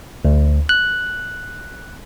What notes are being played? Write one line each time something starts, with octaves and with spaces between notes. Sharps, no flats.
D2
F#6